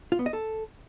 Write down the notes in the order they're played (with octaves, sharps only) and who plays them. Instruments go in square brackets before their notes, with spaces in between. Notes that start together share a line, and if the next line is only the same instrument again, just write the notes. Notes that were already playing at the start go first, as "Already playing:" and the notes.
[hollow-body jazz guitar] F4
B3
D#5
A4